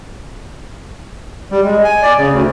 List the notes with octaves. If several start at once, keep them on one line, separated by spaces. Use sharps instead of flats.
G3
G#3
G#5
D5
C#3
D2